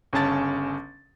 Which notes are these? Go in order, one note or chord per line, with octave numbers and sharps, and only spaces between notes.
G1 C#3 C#4 A5 A6